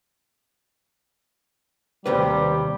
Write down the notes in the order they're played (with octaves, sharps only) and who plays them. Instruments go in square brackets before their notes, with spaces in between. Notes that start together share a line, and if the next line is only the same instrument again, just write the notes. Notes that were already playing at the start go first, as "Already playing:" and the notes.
[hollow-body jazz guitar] D#2 C3 B4 [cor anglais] G3